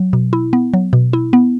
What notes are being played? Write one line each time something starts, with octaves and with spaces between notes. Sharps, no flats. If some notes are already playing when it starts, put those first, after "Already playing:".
Already playing: F#3
B2
E4
B3
F#3
B2
E4
B3